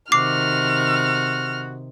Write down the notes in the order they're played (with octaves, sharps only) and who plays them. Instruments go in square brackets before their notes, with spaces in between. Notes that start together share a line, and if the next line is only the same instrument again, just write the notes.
[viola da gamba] C3 D#3 [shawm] F#4 [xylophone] D6 C7 [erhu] F6